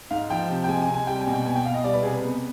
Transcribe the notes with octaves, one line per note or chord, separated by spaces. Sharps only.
G#2 F5
F3 G5
C3
G5
G#3 G#5
G#5
C3
G#5
G3 G5
G#5
B2
G5
B3 G#5
G5
B2 F5
D#5
G3 D5
B4
C3 G#4
B4
B3